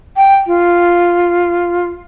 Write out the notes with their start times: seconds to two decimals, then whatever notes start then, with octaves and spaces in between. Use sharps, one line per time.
0.16 G5
0.47 F4